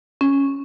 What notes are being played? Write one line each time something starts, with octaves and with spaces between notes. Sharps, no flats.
C#4